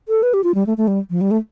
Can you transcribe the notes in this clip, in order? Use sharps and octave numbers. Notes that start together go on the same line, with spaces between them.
A4
B4
G4
F4
G3
A3
A3
G3
F3
G3
A3